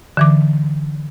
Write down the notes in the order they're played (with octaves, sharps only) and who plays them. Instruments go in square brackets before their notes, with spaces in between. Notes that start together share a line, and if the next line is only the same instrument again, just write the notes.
[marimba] D3 E3 D6